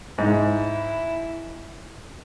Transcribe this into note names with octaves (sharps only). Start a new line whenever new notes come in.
G#2 E4